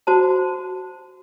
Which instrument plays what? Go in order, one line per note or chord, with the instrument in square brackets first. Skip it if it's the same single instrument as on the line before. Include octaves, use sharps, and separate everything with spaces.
[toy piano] F#4 C5 A5